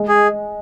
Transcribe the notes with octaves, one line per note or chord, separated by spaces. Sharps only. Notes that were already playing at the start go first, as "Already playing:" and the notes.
Already playing: G#3
G#4